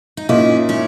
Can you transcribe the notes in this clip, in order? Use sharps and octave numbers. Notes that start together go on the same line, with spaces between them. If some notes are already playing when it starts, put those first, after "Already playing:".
D#4
A#2 A#3 C#4 D#4 E4
C#4 E4